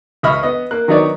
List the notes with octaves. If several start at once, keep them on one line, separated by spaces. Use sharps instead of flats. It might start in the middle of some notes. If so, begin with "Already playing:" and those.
C#2 D#5 E5 B5 C#6 F6
B3 D#5
A#3 F#6
D#3 F#3 B3 D#4 C#5 D5